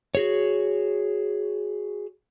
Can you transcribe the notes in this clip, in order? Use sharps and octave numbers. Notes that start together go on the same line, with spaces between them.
F#4 G#4 C#5